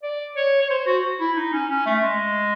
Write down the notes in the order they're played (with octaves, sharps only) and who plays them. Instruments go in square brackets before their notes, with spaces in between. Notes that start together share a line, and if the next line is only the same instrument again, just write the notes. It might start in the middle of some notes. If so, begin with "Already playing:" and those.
[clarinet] D5
C#5
C#5
C5
F#4
E4
D#4
C#4
C#4
A3
G#3